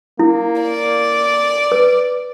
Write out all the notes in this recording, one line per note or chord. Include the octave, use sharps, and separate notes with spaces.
A#3 E4
D5
B4